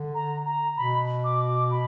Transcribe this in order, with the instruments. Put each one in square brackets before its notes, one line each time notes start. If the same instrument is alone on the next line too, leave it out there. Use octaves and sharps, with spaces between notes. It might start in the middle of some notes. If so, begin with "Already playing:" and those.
Already playing: [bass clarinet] D3
[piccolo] A#5
A#5
[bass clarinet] B2 [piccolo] B5
[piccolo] D6
D6
B5